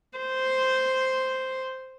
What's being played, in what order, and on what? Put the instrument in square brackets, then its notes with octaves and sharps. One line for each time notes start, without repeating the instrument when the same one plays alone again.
[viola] C5